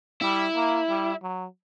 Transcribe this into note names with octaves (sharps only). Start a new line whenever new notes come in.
G3 E4
A#3
G3
F#3